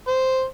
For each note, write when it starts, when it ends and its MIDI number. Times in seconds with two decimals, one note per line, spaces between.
0.08 0.44 72